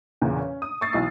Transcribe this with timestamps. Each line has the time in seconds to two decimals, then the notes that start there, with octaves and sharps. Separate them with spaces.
0.21 E2 A#2 C#3
0.37 C#4
0.62 D#6
0.81 C#6 E6 A6 C7
0.93 B1 E3 D#4 D#6 C7